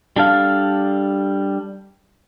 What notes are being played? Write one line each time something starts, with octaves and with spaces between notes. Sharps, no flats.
G3 D4 A4 F5